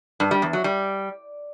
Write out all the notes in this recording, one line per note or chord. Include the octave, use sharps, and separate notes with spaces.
G2
G3
E2
F#3
G3